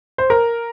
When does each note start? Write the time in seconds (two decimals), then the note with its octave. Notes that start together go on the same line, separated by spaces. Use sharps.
0.18 C5
0.30 A#4